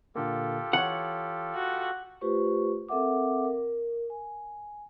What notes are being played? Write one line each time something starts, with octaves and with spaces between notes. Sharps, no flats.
A#2 D3 A#3 F4 G4 A4
E3 C#5 F#5
F#4
A3 F4 G4 B4 C5 C#6
C4 A4 A#4 E5 F#5 D6
A#4
G#5